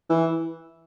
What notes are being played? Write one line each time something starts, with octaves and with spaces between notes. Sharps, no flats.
E3